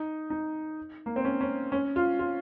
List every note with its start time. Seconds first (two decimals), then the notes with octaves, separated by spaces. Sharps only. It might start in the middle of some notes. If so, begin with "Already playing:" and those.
Already playing: D#4
0.30 D#4
1.06 A#3
1.16 C4
1.25 C#4
1.41 C#4
1.72 C#4
1.96 F4
2.19 F4